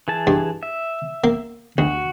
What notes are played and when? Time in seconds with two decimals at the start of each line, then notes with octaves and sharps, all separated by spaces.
0.08 E3 G#4 A5
0.27 G2
0.63 E5
1.24 A#3
1.78 D2 F#4